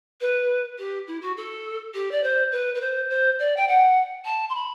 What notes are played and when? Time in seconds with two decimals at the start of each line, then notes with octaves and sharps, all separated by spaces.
0.21 B4
0.78 G4
1.07 E4
1.22 F#4
1.37 A4
1.94 G4
2.11 D5
2.23 C5
2.52 B4
2.75 B4
2.81 C5
3.10 C5
3.39 D5
3.56 G5
3.68 F#5
4.25 A5
4.50 C6
4.55 B5